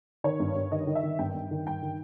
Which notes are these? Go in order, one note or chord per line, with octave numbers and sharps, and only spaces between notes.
D#3 C#5
G2
G2
D#3 D#5
D#3
E5
D#3
G2 G5
G2
D#3
G2 G5
D#3